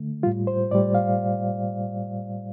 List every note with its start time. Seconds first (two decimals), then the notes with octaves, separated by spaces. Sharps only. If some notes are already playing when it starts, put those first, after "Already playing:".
Already playing: D3 A3
0.23 A2 G3 F4
0.47 C5
0.71 A2 G3 D5
0.95 F5